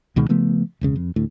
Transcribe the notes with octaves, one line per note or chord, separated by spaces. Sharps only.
C#2 B2 D#3 G#3
C#3 F3 A3 B3
E1 C#2 C#3
F2
D2 A2